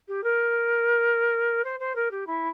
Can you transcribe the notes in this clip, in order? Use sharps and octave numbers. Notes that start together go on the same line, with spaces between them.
G4
A#4
C5
C5
A#4
G4
E4